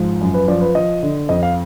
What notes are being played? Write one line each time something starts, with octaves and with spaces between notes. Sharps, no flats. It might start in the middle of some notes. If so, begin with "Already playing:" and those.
Already playing: G#2 F3
F#2
B4
F3 D5
B4
F3 D#5
D3
F2 D#5
F5